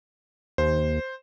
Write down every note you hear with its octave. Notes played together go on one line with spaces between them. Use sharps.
D#2 C5